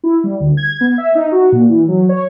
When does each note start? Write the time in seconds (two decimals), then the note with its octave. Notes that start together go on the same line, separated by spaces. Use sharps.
0.04 E4
0.24 G3
0.40 D2
0.57 G#6
0.81 B3
0.98 E5
1.15 D#4
1.32 F#4
1.52 A#2
1.69 E3
1.88 F#3
2.09 C#5